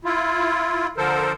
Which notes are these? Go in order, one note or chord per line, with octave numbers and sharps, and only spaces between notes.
E4 F4
D3 F3 A4 A#4 C5